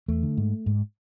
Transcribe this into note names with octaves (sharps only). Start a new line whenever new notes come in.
E2 A3
D3
G#2
G#2